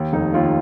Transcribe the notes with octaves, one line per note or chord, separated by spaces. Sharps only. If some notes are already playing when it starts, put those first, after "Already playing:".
Already playing: D#2
F1 D#4
D#2 F4